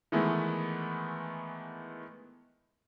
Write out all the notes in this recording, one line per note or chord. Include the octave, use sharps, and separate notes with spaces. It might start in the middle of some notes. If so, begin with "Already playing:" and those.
D#3 E3 G#3 A3 B3 E4